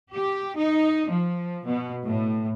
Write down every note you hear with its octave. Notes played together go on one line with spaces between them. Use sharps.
G4
D#4
F3
B2
A2